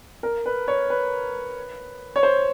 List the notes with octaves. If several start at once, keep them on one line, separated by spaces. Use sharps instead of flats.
A#4
B4
C#5
B4
C#5
C5